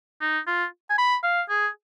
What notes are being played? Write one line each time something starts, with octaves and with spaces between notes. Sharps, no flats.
D#4
F4
G#5
B5
F5
G#4